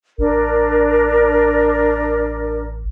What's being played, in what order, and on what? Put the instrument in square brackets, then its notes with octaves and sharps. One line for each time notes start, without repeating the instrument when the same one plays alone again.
[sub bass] A1 [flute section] D4 A#4